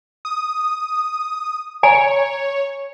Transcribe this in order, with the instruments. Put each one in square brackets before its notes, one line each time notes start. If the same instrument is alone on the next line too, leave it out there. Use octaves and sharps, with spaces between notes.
[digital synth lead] D#6
[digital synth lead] C#5 [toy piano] G#5 A#5